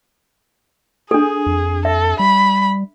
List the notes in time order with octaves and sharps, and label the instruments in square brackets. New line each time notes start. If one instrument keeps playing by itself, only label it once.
[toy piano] D4 A4 [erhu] G#4
[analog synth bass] F2
[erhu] A4 [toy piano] E5
[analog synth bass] G3 [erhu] B5